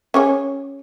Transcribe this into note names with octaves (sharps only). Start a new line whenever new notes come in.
C#4 G#4 C#5